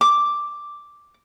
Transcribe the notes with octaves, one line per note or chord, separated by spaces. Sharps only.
D6